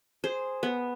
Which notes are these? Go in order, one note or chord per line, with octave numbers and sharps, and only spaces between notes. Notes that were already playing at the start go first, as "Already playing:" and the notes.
G#4 C5
B3